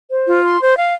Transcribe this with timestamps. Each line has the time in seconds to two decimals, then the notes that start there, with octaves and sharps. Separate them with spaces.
0.10 C5
0.27 F4
0.43 C6
0.60 C5
0.77 F5